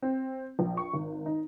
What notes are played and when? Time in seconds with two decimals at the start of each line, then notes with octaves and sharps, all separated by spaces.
0.02 C4
0.59 A#1
0.77 C#6
0.93 G#1
1.26 D#4